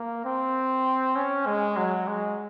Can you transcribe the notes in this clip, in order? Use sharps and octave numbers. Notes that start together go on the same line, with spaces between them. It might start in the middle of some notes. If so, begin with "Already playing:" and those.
Already playing: A#3
C4
C#4
G#3
F#3
G#3